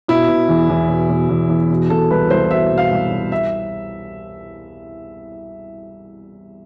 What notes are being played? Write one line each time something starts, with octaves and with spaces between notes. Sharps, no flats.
B2 E4
B2
E2
E2
B2
B2
E2
E2
B2
B2 A4
C2 B4
C2 C5
B2 E5
B2
F5
C2
C2
E5